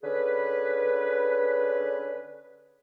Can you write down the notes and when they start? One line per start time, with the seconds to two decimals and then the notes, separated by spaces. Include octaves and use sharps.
0.03 D3 C#4 G#4 B4